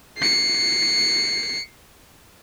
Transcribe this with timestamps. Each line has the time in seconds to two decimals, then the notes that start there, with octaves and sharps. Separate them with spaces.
0.18 C7 C#7